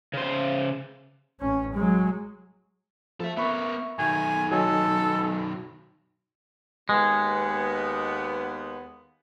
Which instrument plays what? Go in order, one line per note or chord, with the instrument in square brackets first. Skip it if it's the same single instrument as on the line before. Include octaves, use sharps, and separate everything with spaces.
[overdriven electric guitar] C#3 C5
[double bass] A1 C#4
F#3 G#3
[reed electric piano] F3 [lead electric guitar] A4 E5
[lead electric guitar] B3 A#4 [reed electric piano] E5 B5 C#6
[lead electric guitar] B1 D#3 [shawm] G#5
[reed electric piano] F#3 D#5 G#5 [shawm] A4
[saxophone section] D#2 B3 [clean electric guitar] G#3